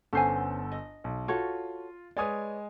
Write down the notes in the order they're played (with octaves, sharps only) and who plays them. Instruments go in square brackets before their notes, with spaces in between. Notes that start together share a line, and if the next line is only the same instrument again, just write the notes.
[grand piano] G1 B3 A4 [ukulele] C#4 C5 G#5
[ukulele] D#5
[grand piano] B1
[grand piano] F4 [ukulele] F#4 A4 C#5
[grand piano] G#3 G#5 D#6 [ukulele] B4 C#5 D5